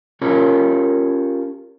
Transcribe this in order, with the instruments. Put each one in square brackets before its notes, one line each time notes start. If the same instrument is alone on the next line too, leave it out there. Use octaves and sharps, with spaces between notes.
[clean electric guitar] C#4 F4 G4 A4 A#4 C#5